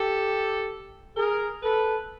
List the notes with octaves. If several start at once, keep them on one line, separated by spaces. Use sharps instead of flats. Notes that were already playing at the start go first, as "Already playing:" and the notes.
Already playing: G4 A4
G#4 A#4
A4 B4